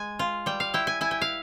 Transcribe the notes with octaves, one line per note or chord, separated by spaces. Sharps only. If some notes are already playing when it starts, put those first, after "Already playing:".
Already playing: G#3 G#5
F4
G3 G5
F5
E4 G5
G#5
E4 G#5
G5
F5